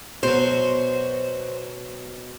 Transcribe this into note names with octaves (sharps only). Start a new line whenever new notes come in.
B2 F#3 C5